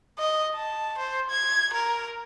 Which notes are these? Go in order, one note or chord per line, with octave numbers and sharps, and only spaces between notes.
D#5
A5
C5
G#6
A#4